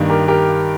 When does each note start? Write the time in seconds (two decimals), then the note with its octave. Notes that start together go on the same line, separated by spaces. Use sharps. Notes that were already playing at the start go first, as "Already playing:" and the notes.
Already playing: G2 D#3 A#3 D4
0.10 G4 A#4
0.28 G4 A#4